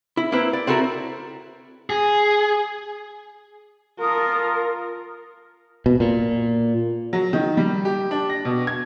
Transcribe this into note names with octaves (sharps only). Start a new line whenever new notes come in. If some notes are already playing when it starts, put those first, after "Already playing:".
E4
A#3 C4 E4 B4
D5
C4 E4 F#4 A4 A#4
G#4
F4 A4 A#4 D#6
B2
A#2
F#3
D#3
G3
G4
D4
A#6
B2
G#6